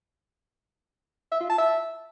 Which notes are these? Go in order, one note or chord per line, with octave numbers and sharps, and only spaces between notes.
E5
F4
A5
E5